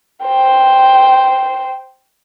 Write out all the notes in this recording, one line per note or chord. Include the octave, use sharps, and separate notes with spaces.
C5 G5